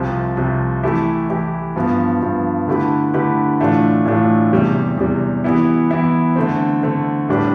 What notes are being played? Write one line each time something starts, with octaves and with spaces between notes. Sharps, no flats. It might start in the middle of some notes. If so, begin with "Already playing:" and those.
Already playing: C2 C3 F3
C2 C3 F3
E3 A3 E4 G4
E3 A3 E4 G4
G2 F3 B3
G2 F3 B3
D3 A3 E4 G4 B4
D3 A3 E4 G4 B4
A2 E3 A3 D4 F4
A2 E3 A3 D4 F4
E2 C3 G3
E2 C3 G3
E3 B3 E4
E3 B3 E4
D3 A3 C4
D3 A3 C4
A2 G3 D4 G4 B4